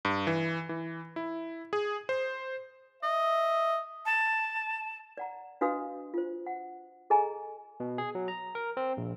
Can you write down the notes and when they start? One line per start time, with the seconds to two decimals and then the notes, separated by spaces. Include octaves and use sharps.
0.05 G2
0.27 E3
0.69 E3
1.16 E4
1.73 G#4
2.09 C5
3.03 D#5 E5
4.05 A5
5.17 D5 F#5 A#5
5.61 D4 F#4 B4 D#5 F5 D#6
6.14 F4 C5
6.46 F#5
7.10 G#4 A4 D#5 G#5 A#5
7.80 B2
7.98 G#4
8.15 F#3
8.28 A#5
8.55 A#4
8.77 C4
8.97 A#1